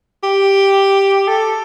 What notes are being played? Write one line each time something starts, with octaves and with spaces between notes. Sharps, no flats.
G4
A4